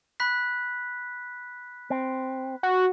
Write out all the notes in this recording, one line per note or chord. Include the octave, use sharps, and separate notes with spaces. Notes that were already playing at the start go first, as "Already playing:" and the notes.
B5 F#6 B6
C4
F#4